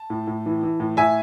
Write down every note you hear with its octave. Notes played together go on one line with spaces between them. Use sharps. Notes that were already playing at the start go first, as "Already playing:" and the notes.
Already playing: A5
A2
A2
E3
E3
A2
A2 E5 G#5